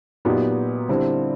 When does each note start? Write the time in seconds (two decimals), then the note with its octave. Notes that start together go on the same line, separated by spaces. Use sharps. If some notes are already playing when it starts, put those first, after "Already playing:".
0.25 A#2 F#3 B3 D#4 G4
0.89 D3 G3 C4 E4